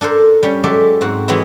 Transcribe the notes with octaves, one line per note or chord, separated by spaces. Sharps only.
D4 A4 A#4 C5
G3 C#4
F#3 G#3 G4 A4 D5 E5
G#2 C4 F#4
E3 F#3 G#3 B3 C4 E4